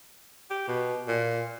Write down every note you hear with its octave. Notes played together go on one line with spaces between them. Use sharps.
G4
B2
A#2